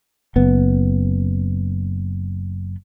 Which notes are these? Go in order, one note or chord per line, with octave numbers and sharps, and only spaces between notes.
F#1 B3